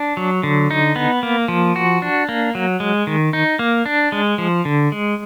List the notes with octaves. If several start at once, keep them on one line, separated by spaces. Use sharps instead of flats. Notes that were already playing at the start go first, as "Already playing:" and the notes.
Already playing: D4
F#3
D3
D#4
B3
A#3
F3
F#4
D4
A#3
F#3
G#3
D#3
D#4
A#3
D4
G#3
F3
D3
G#3